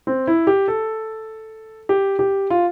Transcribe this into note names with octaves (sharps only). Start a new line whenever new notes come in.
C4
E4
G4
A4
G4
G4
F4